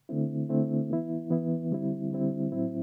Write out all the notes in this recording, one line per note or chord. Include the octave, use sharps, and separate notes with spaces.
D3 A3 C4 E4
D3 A3 C4 E4
E3 B3 E4
E3 B3 E4
D3 G3 C4 E4
D3 G3 C4 E4
A2 F#3 C4 E4